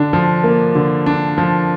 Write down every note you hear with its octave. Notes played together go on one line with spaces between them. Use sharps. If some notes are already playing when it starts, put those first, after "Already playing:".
Already playing: D3 D4
F3
A#3
D3
D4
F3